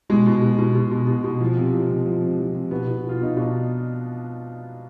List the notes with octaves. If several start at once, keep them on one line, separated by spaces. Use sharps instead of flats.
B2 G#3
B2
B2
B2
B2
B2
B2
B2
F3
C3
F3
C3
F3
C3
F3
C3
B2 B3
B2
B2
F4
B2 D#4
B2 D4